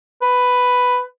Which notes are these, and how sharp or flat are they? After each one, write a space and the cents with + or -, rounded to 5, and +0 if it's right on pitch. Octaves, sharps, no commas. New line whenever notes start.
B4 +5